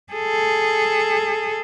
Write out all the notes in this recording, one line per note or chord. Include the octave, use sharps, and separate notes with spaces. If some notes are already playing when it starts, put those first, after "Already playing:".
G#4 A4